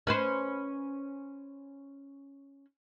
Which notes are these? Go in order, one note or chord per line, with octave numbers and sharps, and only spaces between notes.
C#4 B4 C5